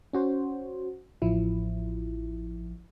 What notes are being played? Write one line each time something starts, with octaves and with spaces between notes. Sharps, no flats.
C#4 F#4 C5
A1 F3 E4